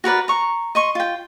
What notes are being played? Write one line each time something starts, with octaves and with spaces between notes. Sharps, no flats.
F#4 A#4 B4 D5
A#5 C#6
D#5 C6 C#6
F4 G5